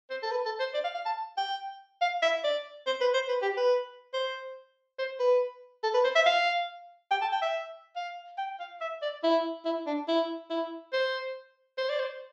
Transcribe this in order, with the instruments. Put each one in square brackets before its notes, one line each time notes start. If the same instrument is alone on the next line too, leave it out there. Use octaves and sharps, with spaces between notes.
[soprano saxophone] C5
A4
B4
A4
C5
D5
F5
F5
A5
G5
F5
E5
D5
C5
B4
C5
B4
G4
B4
C5
C5
B4
A4
B4
C5
E5
F5
G5
A5
G5
E5
F5
G5
F5
E5
D5
E4
E4
D4
E4
E4
C5
C5
D5
C5